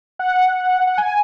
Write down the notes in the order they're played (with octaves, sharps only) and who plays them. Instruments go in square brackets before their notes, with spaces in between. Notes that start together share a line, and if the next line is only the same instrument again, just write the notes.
[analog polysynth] F#5
F#5
G#5